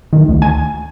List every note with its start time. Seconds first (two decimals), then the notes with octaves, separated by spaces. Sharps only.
0.13 D#3
0.28 D2
0.42 G#5